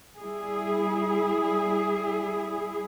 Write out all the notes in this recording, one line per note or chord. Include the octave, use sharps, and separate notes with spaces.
G3 E4 G#4